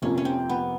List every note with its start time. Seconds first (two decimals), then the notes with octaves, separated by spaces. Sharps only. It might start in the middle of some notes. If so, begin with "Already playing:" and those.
0.02 F1 F2 C3 F3 A#3 C#4
0.18 C#4
0.25 C4
0.50 B3